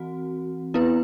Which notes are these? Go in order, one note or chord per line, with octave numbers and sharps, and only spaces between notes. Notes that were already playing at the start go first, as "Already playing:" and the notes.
Already playing: E3 C4 F#4
B3 E4 B4